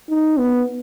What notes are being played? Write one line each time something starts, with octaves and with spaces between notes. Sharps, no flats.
D#4
B3